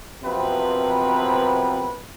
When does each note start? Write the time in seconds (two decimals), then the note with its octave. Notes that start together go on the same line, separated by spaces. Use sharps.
0.24 F#2 C3 F3 B3 C4 B4